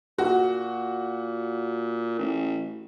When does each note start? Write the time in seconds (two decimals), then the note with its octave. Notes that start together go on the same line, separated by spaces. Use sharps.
0.18 A#2 F#4
2.19 A1